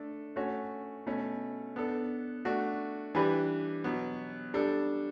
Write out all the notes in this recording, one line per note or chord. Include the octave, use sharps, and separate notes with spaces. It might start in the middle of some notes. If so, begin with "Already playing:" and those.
Already playing: A3 D4 A4
A3 C#4 F#4 C#5
B2 A3 C#4
B3 D4 A4
A3 D4 F#4
E3 G3 D4 G4 B4
B2 F#3 B3
G3 D4 A4